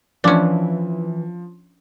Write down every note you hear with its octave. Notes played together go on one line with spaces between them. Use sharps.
E3 F3 C#4 D4